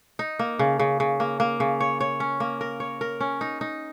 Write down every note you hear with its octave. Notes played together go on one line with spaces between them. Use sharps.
D#4
A#3
C#3
C#3
C#3
A#3
A#3
C#3
C#5
C#5
C#4
A#3
A#4
C#5
A#4
C#4
D#4
D#4